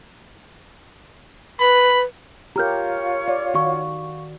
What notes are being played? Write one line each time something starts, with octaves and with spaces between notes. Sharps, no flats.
B4 B5
F4 G4 A#4 C#5 A#5 F6 G6
D5
D#3 F#4 F5 C#6